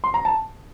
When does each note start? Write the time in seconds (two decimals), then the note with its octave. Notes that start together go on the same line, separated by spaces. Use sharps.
0.04 C6
0.14 A#5
0.25 A5